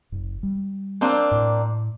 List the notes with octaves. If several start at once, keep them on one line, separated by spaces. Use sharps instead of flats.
F#1
G3
A#3 C4 D4
A2